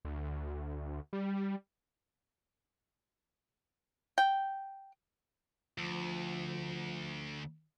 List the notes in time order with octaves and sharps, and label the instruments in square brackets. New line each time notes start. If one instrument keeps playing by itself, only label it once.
[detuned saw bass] D2
G3
[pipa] G5
[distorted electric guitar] D2 [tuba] F3